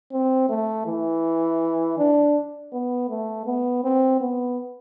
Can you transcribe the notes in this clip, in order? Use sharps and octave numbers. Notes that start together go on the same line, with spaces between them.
C4
A3
E3
D4
B3
A3
B3
C4
B3